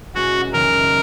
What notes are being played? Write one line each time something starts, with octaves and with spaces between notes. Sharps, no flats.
B2 G#3 C#4 E4 F#4 G#4
F#2 C#3 E3 A#3 D#4 A#4